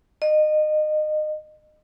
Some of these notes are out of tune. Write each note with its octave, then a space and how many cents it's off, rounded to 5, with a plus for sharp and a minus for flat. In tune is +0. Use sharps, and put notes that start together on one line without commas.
D#5 -25